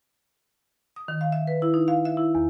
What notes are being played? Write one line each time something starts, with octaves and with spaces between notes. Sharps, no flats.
D#6
D#3
F5
E5
B4
E4
D#4
F5
E5
E4
E2